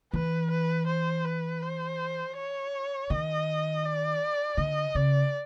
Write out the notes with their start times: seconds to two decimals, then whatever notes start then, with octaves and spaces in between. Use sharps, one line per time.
0.13 E3 B4
0.51 B4
0.87 C5
1.25 B4
1.62 C5
2.36 C#5
3.10 D#3 D#5
3.84 D5
4.57 D3 D#5
4.95 C#3 D5